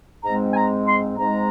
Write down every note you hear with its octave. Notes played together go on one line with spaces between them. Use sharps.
G#2 G#3 C4 A#5
G#5
A#5
C6
G#2 G#3 C4 A#5